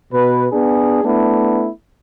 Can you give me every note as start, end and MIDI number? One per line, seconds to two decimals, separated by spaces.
0.12 0.47 47
0.12 0.47 71
0.52 1.03 59
0.52 1.03 62
0.52 1.03 68
1.03 1.68 57
1.03 1.68 59
1.03 1.68 62
1.03 1.68 64